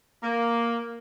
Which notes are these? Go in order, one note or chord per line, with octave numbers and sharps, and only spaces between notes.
A#3